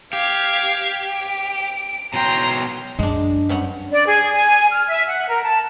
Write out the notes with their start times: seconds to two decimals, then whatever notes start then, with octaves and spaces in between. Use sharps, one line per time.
0.13 G4 F5 G#6
1.17 D7
2.14 B2 F#3 G5 A#5 C6
2.99 F#2 G#3 D4
3.49 G2 C#4 F#5
3.92 D5
4.06 G#4
4.34 G#5
4.71 F6
4.88 E5
5.07 F#5
5.29 A#4
5.44 A5